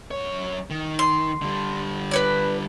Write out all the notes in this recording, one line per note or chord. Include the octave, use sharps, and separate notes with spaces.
F#2 C#5
D#3
C6
D3 G3
B4 C#5 D5